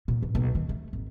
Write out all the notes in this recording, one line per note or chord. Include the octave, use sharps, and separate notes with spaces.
A#2
A1
B1
D#3
A3
G#1